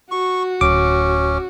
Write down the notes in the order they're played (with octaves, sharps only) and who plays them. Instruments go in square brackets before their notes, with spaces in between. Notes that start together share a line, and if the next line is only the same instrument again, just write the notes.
[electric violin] F#4 [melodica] C#6
[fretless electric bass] D1 [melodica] C#4 [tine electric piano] D6